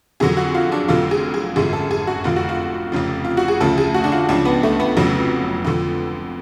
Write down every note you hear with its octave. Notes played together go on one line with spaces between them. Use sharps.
F2 D3 F#3 G#4
F#4
F4
D4
F1 F2 D3 F#3 F4
G#4
G#4
G#1 F#2 D3 F3 G#4
A4
G#4
F#4
F1 F2 D3 F4
F#4
F4
F1 F2 C#3 F3
F4
F#4
G#4
D2 C#3 F3 A4
G#4
F#4
D4
F4
C#2 C#3 F3 D4
B3
A3
B3
F1 F2 C#3 F#3
F2 D3 F3